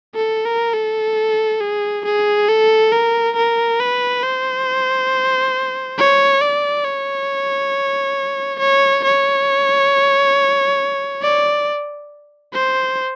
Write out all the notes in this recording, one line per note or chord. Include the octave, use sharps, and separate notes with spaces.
A4
A#4
A4
G#4
G#4
A4
A#4
A#4
B4
C5
C#5
D5
C#5
C#5
C#5
D5
C5